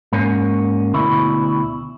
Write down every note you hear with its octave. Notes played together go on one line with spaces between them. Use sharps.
G#2 A#3 C#4
D2 B2 E4